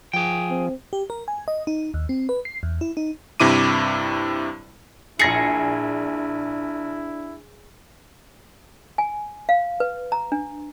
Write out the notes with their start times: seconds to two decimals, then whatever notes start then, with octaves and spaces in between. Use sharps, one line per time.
0.13 F3 G#4 G5
0.50 C4
0.93 G4
1.10 A#4
1.28 G#5
1.48 D#5
1.67 D#4
1.94 D#2
2.09 C4
2.29 B4
2.45 C7
2.63 E2
2.81 E4
2.97 D#4
3.40 G2 C3 E4 D6 D#7
5.19 A#1 D4 E4 G#4 A#6 C#7
8.98 G#5
9.49 F5
9.80 B4
10.12 A#5
10.32 D4